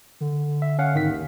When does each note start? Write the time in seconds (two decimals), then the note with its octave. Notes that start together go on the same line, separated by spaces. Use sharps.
0.20 D3
0.62 E5
0.79 C#4 F5 F#5
0.94 G#1 D#3 B6
1.09 D#2